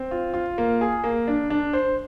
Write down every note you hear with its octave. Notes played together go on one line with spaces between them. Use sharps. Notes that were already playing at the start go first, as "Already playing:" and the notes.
Already playing: C4
F4
F4
A#3
G#4
A#3
D4
D4
C5